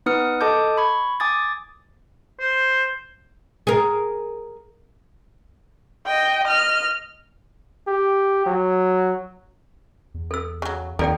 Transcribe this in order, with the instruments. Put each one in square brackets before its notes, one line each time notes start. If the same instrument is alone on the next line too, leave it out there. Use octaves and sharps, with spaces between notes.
[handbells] B3 D#4 B4 D#6 F6 C#7
A4 D#5 A5 D6 D#6 G6
B5 C#6 G#6
G#5 D6 D#6 G#6 A6
[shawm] C5
[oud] G#4 A#4
[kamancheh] D#5 G5
D#5 F6
[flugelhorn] G4
F#3
[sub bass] E2
[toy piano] A4 E6
[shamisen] C#3 F#3
[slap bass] D#2 [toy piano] A4 D5 G5 [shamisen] A#4